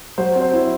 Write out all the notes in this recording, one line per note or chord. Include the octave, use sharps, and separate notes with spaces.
F#3 C5
C4
C5
E4